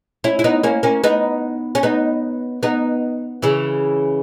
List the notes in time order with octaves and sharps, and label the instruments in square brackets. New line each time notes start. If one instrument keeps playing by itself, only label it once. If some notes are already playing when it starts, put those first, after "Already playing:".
[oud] C#4 E4
E4
B3 D#4
A#3 C#4
A#3 C#4
B3 D#4
C#4
B3 D#4
B3 D#4
C#3 E3